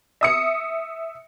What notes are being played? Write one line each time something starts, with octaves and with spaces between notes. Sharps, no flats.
E5 D#6 C#7